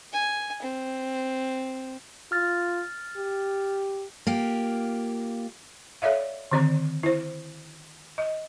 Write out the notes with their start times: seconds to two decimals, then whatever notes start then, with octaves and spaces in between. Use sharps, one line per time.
0.13 G#5
0.62 C4
2.32 F4 F6 A6
3.17 G4
4.27 A#3 F4 G4
6.02 A4 C#5 D5 E5 F5
6.51 D3 D#3 C4 D5 A#5
7.03 E4 C5
8.18 D#5